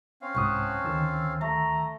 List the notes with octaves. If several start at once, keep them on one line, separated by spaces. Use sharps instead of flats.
C4 C#4 F5
C2 G#2 F#5 A5 C#6 D#6
D2 D#3 A4 E6
A3 A#5